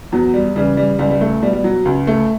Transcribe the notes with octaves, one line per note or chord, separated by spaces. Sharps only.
E2 F#3
G3
C#3 E3 G3
G3
C#2 G3
G3
A3
B2 G3
G3
F#3
C#2
A3